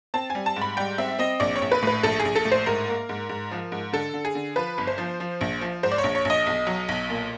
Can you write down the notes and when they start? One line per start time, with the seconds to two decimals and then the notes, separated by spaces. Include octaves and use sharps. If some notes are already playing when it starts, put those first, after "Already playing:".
0.14 C4 A5
0.30 G3 G#5
0.46 A5
0.56 G#2
0.62 B5
0.77 G3 G5
0.98 C4 E5
1.19 C4 D#5
1.40 A#1 D5
1.56 C#5
1.62 A#1
1.72 B4
1.82 A2 B4
2.03 A#1 A4
2.20 G#4
2.25 A#1
2.36 A4
2.45 A2
2.51 C5
2.66 G#2 A#4
2.88 A#3
3.09 G#2
3.29 G#2
3.51 F3
3.72 G#2
3.93 D3 A4
4.14 D3
4.25 G#4
4.35 D3
4.56 F3 B4
4.78 G1
4.87 C5
4.98 F3
5.20 F3
5.41 A#1
5.61 F3
5.83 G#2 C5
5.92 D5
5.98 C#5
6.04 A#1
6.15 C#5
6.25 A#1 D#5
6.46 B1
6.67 F#3
6.89 B1
7.10 A#2